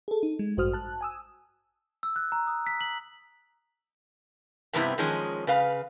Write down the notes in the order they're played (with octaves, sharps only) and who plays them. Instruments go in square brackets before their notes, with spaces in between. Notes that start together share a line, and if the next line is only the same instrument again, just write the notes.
[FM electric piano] G#4 A4
D#4
G#3
A1 G2 F#4 C5 D#6 F6
A5 F#6
G#5 D#6 E6
[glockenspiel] E6
F#6
A#5
D#6
B6
F#7
[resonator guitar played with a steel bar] G2 C3 G3 B3 C4 E4
D#3 F3 G#3 C#4
C#3 B4 F5